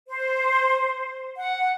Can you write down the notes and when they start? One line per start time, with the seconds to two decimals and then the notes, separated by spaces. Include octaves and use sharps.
0.08 C5
1.37 F#5